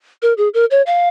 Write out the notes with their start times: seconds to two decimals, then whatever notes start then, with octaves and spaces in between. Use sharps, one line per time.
0.22 A#4
0.37 G#4
0.54 A#4
0.71 C#5
0.86 F5